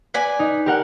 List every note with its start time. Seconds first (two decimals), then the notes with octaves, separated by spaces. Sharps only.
0.14 B4 D5 G#5
0.39 D#4
0.66 G4 A#4 F#5